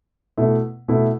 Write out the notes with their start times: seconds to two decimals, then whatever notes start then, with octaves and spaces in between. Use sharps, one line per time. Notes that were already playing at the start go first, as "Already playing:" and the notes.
0.37 B2 A3 E4
0.88 B2 A3 E4